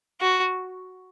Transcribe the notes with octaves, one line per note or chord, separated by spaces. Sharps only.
F#4